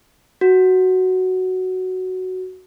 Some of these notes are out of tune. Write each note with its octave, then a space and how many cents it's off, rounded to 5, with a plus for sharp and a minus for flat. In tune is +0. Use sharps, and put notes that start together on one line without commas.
F#4 +5